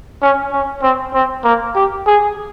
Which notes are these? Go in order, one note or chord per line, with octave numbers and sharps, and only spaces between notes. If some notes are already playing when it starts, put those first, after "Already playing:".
C#4
C#4
C4
C4
A#3
G4
G#4